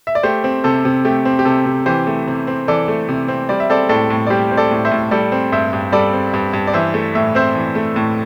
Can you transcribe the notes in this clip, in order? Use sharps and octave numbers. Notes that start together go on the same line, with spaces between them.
E5
D5
A3 G4 C5
C4
C3 A4
C3
A3 G4
C4
G4
C3 A4
C3
E3 G4 C5
A3
C3
C4
E3 A4 D5
A3
C3
C4
G3 D5
E5
C4 A4 D5
A2 A4 D5
A2
D5
G3 G4 C5
C4
A4 D5
A2
C5 E5
A2
G3 A4 D5
C4
G2 C5 E5
G2
G3 A4 D5
C4
G2
G2
D5
E3 C5 E5
A3
A2 E5
C4 C5 E5
E3
A3
A2